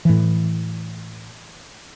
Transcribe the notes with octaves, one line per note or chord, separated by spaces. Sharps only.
A2 E3